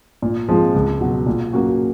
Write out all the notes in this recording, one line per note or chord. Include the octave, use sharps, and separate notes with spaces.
A#2
F3 G#3 C4 F4
C#2
B2 F#3
A#2
F#3 A#3 C#4 F#4